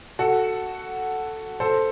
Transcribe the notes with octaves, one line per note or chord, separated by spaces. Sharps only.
F#4 A4
A4 C5